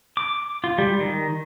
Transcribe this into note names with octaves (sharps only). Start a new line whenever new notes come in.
D6
F4
G3
D#3